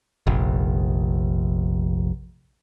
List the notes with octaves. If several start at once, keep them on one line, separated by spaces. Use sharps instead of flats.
F1 A#1